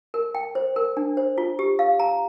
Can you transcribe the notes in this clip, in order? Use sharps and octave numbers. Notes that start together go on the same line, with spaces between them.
A#4
G5
C5
A#4
D4
C5
F4
G4
F5
A#5